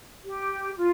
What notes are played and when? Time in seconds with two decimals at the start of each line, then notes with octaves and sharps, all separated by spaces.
0.24 G4
0.77 F4